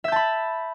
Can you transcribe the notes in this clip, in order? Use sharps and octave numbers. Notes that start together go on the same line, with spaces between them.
E5 A5 B5 G6